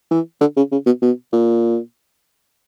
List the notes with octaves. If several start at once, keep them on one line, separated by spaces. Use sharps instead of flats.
E3
D3
C#3
C#3
B2
B2
A#2